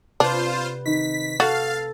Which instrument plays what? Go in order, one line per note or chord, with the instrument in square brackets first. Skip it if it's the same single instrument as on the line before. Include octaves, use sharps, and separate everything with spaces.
[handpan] C3 B4 [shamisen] D4 [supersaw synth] F4 C5
[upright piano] D#3 [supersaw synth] B6
[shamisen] F#4 [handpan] A4 [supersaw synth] F5 [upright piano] A6